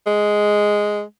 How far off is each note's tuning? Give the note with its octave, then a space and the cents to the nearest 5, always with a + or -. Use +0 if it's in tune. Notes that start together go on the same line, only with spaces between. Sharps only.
G#3 +0